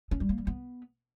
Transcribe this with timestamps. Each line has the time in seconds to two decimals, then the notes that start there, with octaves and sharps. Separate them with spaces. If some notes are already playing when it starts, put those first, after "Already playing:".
0.11 C#4
0.20 G3
0.29 A#3
0.38 G3
0.47 B3